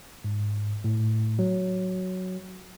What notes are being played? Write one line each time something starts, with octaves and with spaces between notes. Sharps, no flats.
G#2
A2
F#3